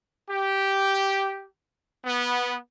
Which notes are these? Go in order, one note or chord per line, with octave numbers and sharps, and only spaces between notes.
G4
B3